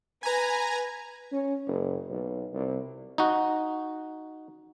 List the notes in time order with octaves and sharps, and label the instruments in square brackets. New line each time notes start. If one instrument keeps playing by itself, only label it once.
[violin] B4 [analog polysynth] G#5 A#5
[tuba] C#4
F#1
B1
C2
[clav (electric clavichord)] D#4 F#4